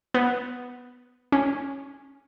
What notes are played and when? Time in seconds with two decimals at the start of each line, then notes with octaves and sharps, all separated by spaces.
0.14 B3
1.32 C#4